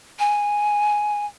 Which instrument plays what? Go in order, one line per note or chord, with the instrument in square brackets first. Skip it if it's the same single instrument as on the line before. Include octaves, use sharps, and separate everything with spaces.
[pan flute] G#5